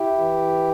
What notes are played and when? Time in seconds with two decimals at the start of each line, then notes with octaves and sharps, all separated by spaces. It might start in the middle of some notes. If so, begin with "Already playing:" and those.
Already playing: E4 G4
0.18 E3